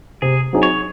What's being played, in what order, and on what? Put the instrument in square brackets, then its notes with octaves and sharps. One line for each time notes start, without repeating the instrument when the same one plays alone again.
[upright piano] C3 [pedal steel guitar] G#4
[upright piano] F#3 C4 D#4 G#4
[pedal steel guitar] C#5